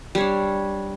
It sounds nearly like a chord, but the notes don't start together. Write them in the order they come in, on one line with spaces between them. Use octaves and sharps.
G3 C#5 D4